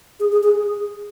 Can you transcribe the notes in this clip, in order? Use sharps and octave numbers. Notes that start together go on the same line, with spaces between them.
G#4
G#4
G#4